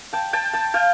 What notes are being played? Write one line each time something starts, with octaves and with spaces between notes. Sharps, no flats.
G5 A5
G5 A5
G5 A5
F5 G5